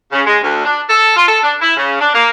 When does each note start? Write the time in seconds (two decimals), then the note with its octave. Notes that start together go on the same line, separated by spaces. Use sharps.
0.11 C#3
0.25 G#3
0.42 D2
0.64 D4
0.88 A4
1.15 F4
1.28 A4
1.42 D4
1.60 E4
1.75 C#3
1.99 D4
2.14 A#3